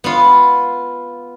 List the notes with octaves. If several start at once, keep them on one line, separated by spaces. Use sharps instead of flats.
B3 F4